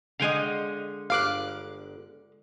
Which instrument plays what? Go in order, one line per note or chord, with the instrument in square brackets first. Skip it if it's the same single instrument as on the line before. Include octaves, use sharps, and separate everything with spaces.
[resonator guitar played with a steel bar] D3 G#3 D#5 [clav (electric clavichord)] F5 G5 G#5
[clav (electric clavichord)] G1 [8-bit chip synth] F5 D6 F#6